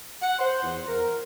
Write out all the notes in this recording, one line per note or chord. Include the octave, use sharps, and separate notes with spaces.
F#5
C5
E2
A#4